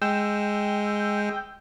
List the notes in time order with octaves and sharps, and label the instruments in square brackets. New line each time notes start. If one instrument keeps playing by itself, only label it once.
[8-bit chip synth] G#3 [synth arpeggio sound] G5 E6 G6